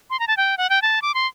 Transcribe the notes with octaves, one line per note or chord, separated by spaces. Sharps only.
C6
A#5
A5
G5
F#5
G5
A5
D6
C6